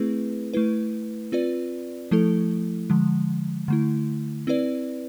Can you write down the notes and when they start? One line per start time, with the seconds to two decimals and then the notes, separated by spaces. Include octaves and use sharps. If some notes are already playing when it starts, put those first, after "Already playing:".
Already playing: A3 C4 E4 G#4 B4
0.54 A3 E4 B4
1.32 C4 F4 B4 D5
2.11 F3 A3 E4 A4
2.90 D3 F3 G#3
3.68 D3 A3 E4
4.47 C4 E4 B4 D5